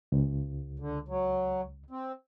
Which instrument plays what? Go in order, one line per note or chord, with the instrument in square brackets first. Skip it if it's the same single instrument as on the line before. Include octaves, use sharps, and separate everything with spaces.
[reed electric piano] C#2
[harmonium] D3
F#3
C4